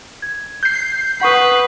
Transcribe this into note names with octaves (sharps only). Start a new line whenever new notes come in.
G#6
G6 C7
B4 F#5 C#6 D#6